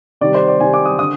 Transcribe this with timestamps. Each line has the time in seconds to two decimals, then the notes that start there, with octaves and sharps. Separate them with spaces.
0.21 C3 D#3 G3 D5
0.34 C5
0.48 D5
0.60 C3 D#3 G3 G#5
0.74 D6
0.85 D#6
0.99 D3 D#6